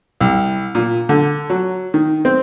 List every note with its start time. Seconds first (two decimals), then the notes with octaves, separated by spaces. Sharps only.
0.20 C2
0.75 A#2
1.09 D3
1.50 F#3
1.94 D#3
2.25 C4